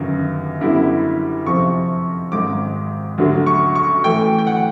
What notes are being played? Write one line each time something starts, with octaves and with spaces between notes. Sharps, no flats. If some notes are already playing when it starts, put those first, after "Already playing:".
Already playing: G1 F#2 D#3
F#2 D3 G3 B3 E4
F2 C3 F3 C#6
G#1 G#2 D#3 D6
D2 D3 F#3
C#6
C#6
A2 E3 A3 G5
G5
F#5